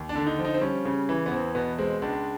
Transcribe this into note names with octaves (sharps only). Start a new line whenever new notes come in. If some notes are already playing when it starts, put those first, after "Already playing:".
Already playing: D#2
D4
D3
D#4
F3
D#4
C4
G3 C#4
C#3
E3
B3
E2 C4
B2 B3
G#3 C4
C#2 D4